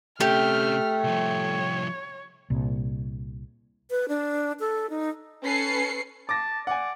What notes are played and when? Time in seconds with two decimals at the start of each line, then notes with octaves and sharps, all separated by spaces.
0.21 C3 A3 C#4 G4 F6
1.04 C2 F3 C#5
2.50 C2 A#2
3.91 B4
4.09 D4
4.60 A4
4.90 D#4
5.43 C#4 A4 B4 C7 C#7
6.29 A5 D6 A#6
6.67 D5 F#5 G#5